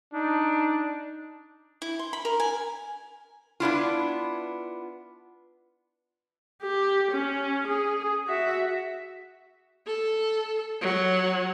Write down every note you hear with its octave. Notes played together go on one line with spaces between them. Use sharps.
D4 D#4
E4
C6
B5
A#4
G#5
B3 D4 E4 F4
G4
C#4
G#4
F#4 E5
A4
F#3